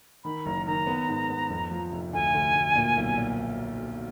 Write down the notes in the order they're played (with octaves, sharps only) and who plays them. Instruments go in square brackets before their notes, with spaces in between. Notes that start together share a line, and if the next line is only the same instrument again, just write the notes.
[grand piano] D#3 [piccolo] B5
[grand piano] F#1 [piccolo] A#5
[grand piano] D#3 [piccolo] A#5
[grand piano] B3
G#2
B3
F2
F3
F1
[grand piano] D2 [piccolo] G#5
[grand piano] D2
D2
A#2
B1
A#2